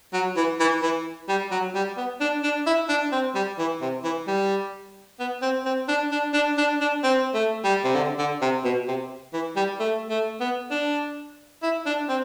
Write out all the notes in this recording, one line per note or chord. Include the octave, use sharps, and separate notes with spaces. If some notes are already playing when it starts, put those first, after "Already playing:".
F#3
E3
E3
E3
G3
F#3
G3
B3
D4
D4
E4
D4
C4
G3
E3
C3
E3
G3
B3
C4
C4
D4
D4
D4
D4
D4
C4
A3
G3
C3
D3
D3
C3
B2
C3
E3
G3
A3
A3
B3
D4
E4
D4
C4